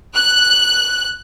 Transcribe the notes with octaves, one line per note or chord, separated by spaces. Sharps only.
F#6